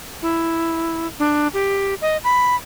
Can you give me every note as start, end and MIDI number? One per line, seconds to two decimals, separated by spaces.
0.22 1.07 64
1.19 1.48 62
1.54 1.94 67
2.01 2.17 75
2.24 2.55 83